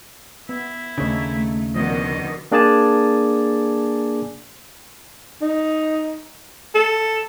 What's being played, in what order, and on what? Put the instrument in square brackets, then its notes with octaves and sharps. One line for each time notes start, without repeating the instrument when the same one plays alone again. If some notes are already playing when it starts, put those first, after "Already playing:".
[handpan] B3 [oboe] E4
[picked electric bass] D#2 C#3 [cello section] A3 [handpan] D4 D#4 C#5
[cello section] B2 D3 D#3 [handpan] F3 [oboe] D#5
[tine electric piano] A#3 D4 G#4 D5 G#5 A5
[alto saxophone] D#4
A4